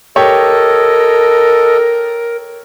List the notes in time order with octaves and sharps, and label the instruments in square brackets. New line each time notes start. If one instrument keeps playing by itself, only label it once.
[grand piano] G4 C#5 [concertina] A4 D#5 [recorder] A#4